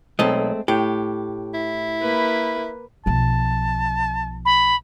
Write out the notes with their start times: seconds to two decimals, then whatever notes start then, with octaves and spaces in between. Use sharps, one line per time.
0.19 B1 G#3 A3 C4 D#5
0.68 A2 G4
1.54 E4
2.01 A#3 B4
3.06 B1 F3 A5
4.45 B5